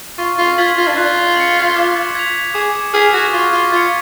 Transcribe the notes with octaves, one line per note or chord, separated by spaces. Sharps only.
F4 C#6
F4
F4 G#6 B6 F#7
F4
D4
F4 F#6
C#7 F#7
D6
G#6 B6 F7
G#4 D6
G#4 F6 B6 F7
F#4
F4 C#6
F4
F4 G#6 C#7